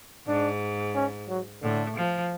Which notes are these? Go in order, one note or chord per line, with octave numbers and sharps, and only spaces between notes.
G#2 D4
C#4
F#3
A2 D3
F3